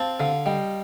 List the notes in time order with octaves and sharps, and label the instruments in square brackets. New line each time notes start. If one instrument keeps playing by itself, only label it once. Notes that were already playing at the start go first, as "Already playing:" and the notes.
Already playing: [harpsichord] C4 [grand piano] F5 A5
[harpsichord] D3 [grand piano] F5 A5
[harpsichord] G3 [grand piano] D#5 G5